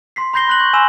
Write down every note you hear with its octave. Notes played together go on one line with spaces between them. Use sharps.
C6 B6 C7
B5 C6 G6 A#6 C7 G7
B5 C6 F#6 A#6 F#7
C#6 G6
G#5 B5 C6 E6 E7